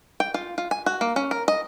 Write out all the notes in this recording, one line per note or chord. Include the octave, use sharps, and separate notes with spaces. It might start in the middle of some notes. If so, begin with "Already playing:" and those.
G5
F4
F4
G#5
F#4
A#3
C#4
A#4
D#5